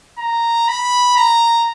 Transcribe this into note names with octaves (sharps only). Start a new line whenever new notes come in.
A#5
B5
A#5